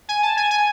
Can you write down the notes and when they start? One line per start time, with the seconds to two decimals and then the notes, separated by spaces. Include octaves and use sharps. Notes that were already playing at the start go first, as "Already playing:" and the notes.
0.09 G#5
0.23 A5
0.37 G#5
0.51 G#5